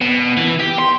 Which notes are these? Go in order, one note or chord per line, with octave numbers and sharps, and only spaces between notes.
B2
E3
G4
C6